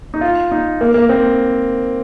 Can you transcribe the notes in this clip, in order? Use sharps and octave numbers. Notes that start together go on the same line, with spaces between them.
D#4
F4
D#4
A#3
A#3
C4